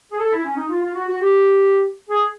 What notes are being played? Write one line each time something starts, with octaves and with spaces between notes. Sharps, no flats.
G#4
A4
E4
C#4
D#4
F4
F4
F#4
F#4
G4
G#4